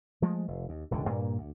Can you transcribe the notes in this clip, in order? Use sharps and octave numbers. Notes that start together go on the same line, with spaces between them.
F3 G#3 A3
F1
D#2
E1 C#2 A2 D3
G2 A#2 A#3
D2